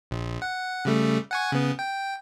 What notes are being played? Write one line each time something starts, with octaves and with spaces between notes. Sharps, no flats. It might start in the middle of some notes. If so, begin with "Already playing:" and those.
A#1
F#5
C#3 G3 A3
F#5 G#5 C#6
C#3 B3
G5